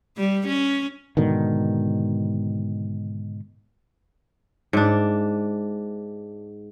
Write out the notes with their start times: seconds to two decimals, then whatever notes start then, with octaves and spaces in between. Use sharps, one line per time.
0.17 G3
0.47 C#4
1.17 G#2 B2 D3 D#3
4.73 G#2 D4